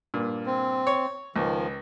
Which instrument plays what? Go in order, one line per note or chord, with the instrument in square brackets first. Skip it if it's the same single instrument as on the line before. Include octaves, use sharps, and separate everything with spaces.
[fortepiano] G2 A#2
[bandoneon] C4
[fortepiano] C#5
[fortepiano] C#2 [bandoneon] D#3 F3